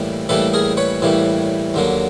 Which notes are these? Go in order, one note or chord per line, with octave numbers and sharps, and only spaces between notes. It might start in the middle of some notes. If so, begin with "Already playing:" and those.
Already playing: A2 E3 G3 A#3
A2 E3 G3 A#3 A4 B4
G#4 A#4
B4 C#5
A2 E3 G3 A#3
D#2 D3 F#3 A#3